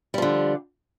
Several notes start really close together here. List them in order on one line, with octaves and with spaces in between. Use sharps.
G3 F3 D3